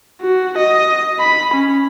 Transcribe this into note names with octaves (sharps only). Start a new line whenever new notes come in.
F#4
D#5
B5
C#4